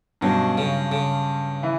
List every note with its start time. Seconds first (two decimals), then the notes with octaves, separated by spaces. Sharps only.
0.21 G2 B2 F#3 C#4
0.58 C#3
0.92 C#3
1.63 E3